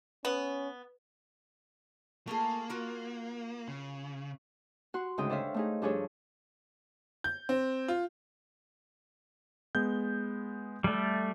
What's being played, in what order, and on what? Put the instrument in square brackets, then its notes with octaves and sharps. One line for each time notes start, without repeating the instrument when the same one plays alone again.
[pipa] B3 [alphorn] C#4
[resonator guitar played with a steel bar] A3 F4 G#4 [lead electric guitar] A#3
[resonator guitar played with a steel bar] F4 F#4 A#4
[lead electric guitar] C#3
[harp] F#4 F#5 C6
D2 G#2 C#3 D#4 G5 D#6
D4 A4 C5 C#5 E5 F5
A3 D#4 G#4
G2 F3 D4 G#4 A4 C#5
[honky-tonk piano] G6
C4
F4
[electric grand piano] G#3 B3 G6
[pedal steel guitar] G3 A3